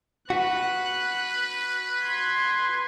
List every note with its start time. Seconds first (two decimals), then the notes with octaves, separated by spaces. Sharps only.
0.30 F#4 B4 F#6
2.03 C6 G#6